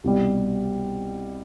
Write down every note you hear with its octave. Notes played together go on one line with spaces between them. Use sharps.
C2 B2 G3